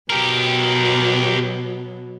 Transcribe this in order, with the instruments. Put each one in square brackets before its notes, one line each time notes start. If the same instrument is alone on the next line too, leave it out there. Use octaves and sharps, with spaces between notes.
[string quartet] B2 F#3 [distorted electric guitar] G4 A#4